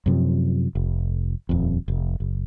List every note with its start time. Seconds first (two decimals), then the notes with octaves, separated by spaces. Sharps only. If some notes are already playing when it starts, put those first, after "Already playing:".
0.06 F#2 C3 F3
0.75 F1
1.49 D#1 F2
1.88 F1
2.20 F#1